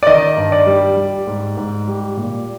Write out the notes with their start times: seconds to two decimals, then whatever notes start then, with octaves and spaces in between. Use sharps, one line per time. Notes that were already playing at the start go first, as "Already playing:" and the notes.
0.03 D5
0.06 D#3 D#5
0.37 G2
0.52 D5
0.66 G3
0.96 G3
1.27 G#2
1.57 G#2
1.88 G3
2.17 A#2